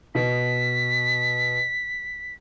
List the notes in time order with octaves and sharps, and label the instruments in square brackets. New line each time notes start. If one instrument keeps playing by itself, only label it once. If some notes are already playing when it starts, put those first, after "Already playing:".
[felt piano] B2 [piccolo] B6